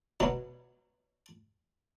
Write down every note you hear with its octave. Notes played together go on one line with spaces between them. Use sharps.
B2 F#3